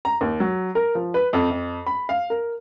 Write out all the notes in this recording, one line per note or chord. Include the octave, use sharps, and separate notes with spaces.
A#5
D#2
F#3
A#4
F3
B4
F2
F2
B5
F5
A#4